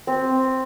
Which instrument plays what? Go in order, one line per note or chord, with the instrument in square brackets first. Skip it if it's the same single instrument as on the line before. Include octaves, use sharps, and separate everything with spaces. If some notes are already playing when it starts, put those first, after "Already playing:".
[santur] C4